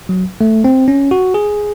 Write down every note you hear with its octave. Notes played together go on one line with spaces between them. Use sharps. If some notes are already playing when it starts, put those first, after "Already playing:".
F#3
A3
C4
C#4
F#4
G#4